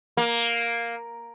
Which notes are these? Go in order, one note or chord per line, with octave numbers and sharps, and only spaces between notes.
A#3